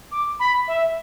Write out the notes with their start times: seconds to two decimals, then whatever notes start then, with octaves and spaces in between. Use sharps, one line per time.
0.12 D6
0.40 B5
0.68 E5